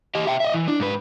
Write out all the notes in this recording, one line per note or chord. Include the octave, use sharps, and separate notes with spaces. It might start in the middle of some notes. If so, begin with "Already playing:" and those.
G4 D#5
E5 G5
D#5 E5
E3
D4
G#2 B4